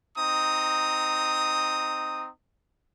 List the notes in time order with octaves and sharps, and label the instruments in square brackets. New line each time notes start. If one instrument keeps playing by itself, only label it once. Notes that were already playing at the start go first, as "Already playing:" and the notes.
[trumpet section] C4 D#4 A#5 D#6